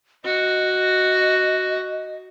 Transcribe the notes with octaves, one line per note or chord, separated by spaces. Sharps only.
F#4 D#5